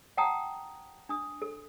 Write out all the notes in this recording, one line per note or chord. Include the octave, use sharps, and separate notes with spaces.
F#5 G5 A5 A#5 D#6
D4 D#6
A4